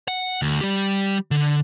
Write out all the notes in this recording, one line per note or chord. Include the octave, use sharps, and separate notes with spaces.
F#5
D2
G3 G4
D3